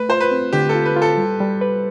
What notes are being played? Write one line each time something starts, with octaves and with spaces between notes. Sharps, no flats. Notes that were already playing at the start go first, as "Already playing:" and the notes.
Already playing: A3 B4
F4 C5
B4
C4
D3 G4
A4
F4
B4
F4
A4
G3
G3
B4